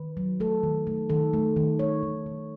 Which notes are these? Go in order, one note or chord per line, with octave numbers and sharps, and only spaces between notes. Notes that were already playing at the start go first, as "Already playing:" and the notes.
Already playing: D#3 B4
F#3
A3 A4
D#3
A3
D#3 A4
A3
D#3
A3 C#5
D#3
D#3